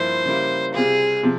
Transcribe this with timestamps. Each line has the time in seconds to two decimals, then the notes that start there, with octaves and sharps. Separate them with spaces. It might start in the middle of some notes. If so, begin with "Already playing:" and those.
Already playing: G2 F3 A#3 E4 C5
0.25 C#3 G3 A#3 E4
0.74 C3 G3 C4 F4 G#4
1.23 C3 F3